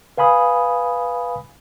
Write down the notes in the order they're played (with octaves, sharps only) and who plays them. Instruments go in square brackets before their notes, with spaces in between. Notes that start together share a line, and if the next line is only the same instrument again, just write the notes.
[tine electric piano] B4 F5 G#5 B5 D#6